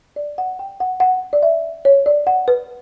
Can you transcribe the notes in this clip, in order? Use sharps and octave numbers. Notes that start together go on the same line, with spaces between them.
D5
F#5
G5
F#5
F#5
D5
E5
C#5
D5
F#5
B4